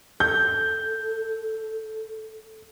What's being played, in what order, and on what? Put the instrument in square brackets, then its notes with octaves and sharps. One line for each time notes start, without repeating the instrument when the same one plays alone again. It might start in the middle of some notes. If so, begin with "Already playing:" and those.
[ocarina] A4 [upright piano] G6